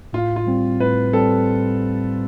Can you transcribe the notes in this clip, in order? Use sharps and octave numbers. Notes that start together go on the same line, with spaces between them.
A2 F4
F4
G3 C4
A2 B4
G3 C4 A4